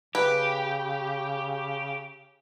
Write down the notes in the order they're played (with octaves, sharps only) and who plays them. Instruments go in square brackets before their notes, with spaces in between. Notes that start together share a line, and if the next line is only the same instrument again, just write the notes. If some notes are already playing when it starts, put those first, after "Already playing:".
[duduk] C#3 [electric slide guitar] G4 [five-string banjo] B4